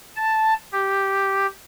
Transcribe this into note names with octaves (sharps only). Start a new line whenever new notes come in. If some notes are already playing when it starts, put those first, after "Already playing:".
A5
G4